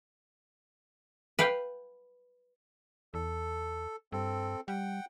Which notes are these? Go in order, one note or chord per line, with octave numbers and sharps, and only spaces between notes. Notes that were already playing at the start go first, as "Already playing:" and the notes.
B4 F5 G5
E2 A4
G2 C4 A4
G3 F#5 G5